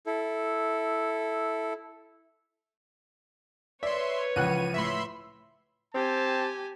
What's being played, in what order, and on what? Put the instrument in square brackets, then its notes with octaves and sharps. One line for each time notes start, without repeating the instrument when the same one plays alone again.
[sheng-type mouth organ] E4 A4
[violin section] B4 C#5 [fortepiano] D5 [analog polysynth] E5 C6
[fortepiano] C#2 F#5 F#6 [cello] E3 F3 [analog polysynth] D#7
[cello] A2 A3 [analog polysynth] E5 B5 C6
[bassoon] C4 [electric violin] G4 G#5 [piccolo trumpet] A5